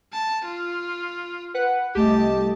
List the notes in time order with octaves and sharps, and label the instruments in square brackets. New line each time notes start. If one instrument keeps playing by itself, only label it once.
[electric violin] A5
F4
[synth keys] B4 F#5 F#6
[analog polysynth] C2 A3 D#5 [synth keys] G4 [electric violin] A5